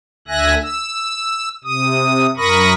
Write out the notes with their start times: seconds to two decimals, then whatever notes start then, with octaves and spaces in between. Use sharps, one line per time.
0.28 D2 D3 E5 G#5 F#6 A#6
0.62 E6
1.64 C3 D#6
2.37 F#2 A#4 B5 C#6 D#6 A#6